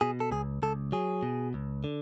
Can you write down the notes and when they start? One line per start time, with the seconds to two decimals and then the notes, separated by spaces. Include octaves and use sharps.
0.01 B2 G#4
0.20 A4
0.31 C#2 G#4
0.62 C#2 A4
0.92 F#3 G#4
1.23 B2
1.54 C#2
1.84 D3